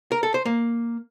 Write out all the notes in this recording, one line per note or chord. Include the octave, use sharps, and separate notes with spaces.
A#4
A4
C5
A#3